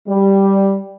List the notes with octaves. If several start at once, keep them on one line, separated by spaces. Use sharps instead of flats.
G3